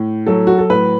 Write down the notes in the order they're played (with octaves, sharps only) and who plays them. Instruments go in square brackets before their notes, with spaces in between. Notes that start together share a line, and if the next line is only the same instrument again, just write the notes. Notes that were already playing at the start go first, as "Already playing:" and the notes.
Already playing: [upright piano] A2
F#3 A4
F#4
A4
A2 B4